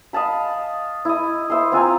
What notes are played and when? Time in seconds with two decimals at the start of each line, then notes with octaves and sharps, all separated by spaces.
0.13 D#5 F5 A5 B5
1.05 E4 D#5
1.50 C5 E5 C6
1.72 C4 F4 G#5 A#5